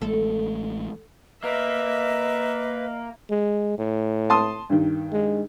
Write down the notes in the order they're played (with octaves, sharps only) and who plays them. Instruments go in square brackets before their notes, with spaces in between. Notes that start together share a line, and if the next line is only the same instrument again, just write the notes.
[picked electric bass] A1 G#3 A3 [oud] A4
[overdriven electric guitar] A#3 [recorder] B4 [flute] D#5 [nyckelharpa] E5
[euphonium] G#3
A2
[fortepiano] A5 C6 D#6
G2 D#3
[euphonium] G#3